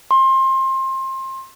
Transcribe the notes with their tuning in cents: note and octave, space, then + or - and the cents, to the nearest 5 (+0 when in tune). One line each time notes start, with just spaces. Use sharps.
C6 +25